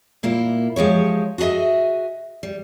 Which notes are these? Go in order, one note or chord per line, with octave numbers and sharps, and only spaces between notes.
A#2 A#3 E4 F4
F3 G#3 G4 C#5
F#4 G#4 A4 D#5 E5
G3